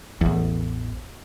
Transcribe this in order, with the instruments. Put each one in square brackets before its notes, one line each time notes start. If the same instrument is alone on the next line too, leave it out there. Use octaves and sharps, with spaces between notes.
[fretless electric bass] A1 E2